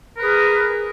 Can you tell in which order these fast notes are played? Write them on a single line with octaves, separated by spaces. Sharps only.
A#4 B4 G#4